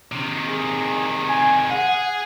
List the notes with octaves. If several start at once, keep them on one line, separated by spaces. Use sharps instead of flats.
C3 D#3
G#4
G#5
G#4 F#5